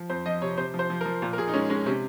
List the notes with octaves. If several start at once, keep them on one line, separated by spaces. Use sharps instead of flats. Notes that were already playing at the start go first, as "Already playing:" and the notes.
Already playing: F3
F2 C5
F3 D#5
C3 C#5
C3 C5
F3
C5
F3
A#4
F3
A#2
A#4
A#2 G#4
D#4
G#3 C#4
G#3 C#4
C3 C#4